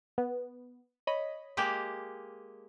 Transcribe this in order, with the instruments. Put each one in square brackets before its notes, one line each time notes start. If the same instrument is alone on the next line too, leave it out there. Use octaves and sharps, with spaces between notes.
[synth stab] B3
C#5 D#5 B5
[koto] G#3 A#3 G4